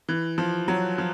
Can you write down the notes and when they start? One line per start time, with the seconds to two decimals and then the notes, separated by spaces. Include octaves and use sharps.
0.09 E3
0.38 F3
0.68 F#3
0.98 F3